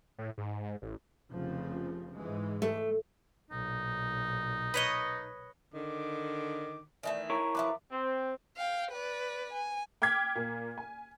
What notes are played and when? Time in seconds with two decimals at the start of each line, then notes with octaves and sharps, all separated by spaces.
0.18 A2
0.38 G#2
0.82 A1
1.30 F1 C#3 F3
2.16 G#2 E3 G#3
2.62 A3
3.50 B1 A#2 D#4
4.74 B4 C#5 D#5
5.74 D3 D#3 D6
7.03 D#3 E3 A3 D5
7.30 E4 A#4 C#5 A#5
7.55 F3 F#4 B4 E5 D6
7.92 C4
8.57 F5 G5
8.91 B4 D5
9.53 G#5
10.02 G5 D6 F6 G#6 B6
10.35 A#2 A#3
10.78 G#5